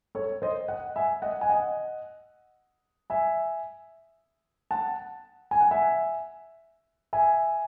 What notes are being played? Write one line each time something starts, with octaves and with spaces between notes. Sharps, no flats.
A4 C#5
C5 D#5
D#5 F#5
E5 G#5
D#5 F#5
G#5
D#5 F#5
E5 G#5
F#5 A5
G#5
F#5
E5 G#5
E5 G#5